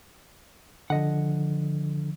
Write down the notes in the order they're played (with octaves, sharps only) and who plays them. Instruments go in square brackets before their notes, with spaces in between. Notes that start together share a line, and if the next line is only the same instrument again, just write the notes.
[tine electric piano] D3 [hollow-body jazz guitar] F3 D#5 F#5